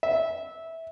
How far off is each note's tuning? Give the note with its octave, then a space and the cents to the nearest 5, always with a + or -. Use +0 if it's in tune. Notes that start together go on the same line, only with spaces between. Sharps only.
E5 -15